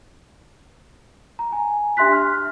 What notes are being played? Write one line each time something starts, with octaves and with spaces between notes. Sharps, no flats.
A#5
G#5
D4 G4 E5 C6 F#6 B6
F6